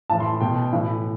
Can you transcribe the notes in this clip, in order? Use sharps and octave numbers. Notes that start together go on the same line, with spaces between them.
A2 E3 A5
C6
B2 G5
A2 E3